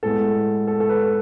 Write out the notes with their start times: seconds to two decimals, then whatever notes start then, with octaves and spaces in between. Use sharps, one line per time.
0.03 A2 G#3 B3 A4
0.67 A4
0.80 A4
0.89 B4
1.03 B4